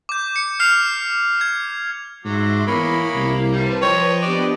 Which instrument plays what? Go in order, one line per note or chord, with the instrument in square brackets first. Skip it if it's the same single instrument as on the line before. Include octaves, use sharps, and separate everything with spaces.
[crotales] D6 G6
C#7
F6 C7 F7
G#6
[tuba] G#2 [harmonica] F#3 D6 [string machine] E5 C6
[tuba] E2 [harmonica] G#3 C#5 B5 [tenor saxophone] A#3 [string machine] E4
[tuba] C2
[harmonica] G3 [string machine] B4 C5 A5
[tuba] F3 [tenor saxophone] C#5 [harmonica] D#5 G5
[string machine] B3 D4 G4 [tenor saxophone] D5